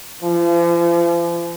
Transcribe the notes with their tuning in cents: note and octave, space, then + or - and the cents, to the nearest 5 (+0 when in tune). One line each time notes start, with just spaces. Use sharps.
F3 -40